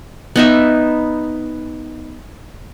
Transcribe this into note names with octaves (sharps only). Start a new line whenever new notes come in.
B3 D#4 E5